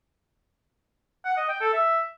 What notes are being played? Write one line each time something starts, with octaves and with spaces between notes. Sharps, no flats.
F#5
D#5
G5
A4
E5